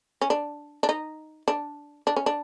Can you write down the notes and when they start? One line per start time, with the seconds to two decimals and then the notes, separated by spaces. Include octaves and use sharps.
0.21 C#4
0.30 D4
0.83 D4
0.89 D#4
1.48 D4
2.07 D4
2.16 C#4
2.26 D4